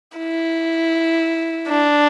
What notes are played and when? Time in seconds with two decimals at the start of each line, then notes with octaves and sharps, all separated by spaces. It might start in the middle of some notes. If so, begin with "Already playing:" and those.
0.18 E4
1.68 D4